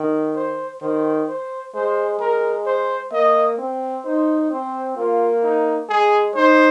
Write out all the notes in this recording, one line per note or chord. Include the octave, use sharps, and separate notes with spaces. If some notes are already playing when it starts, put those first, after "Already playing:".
Already playing: D#3
C5
D#3 C5
C5
G#3 C5
G#3 A#4
C5
A#3 D#5
C4
D#4 C5
C4 C5
A#3 F4
D#4
G#3 G#4
D#4 C5